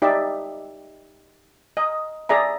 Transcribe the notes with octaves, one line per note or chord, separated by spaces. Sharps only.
D#4 G4 D5 E5
D#5
G#4 D5 E5 A#5